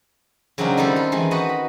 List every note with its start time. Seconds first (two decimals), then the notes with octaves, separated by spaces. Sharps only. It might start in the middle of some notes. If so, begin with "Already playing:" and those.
0.58 C#3 F#3 C4 D4 D#4 A#4
0.77 D#3 G3 C4 D#4 E4 A4
0.96 F4
1.12 D#3 E3 G#3
1.31 D#4 F#4 B4 D#5 F#5
1.49 B5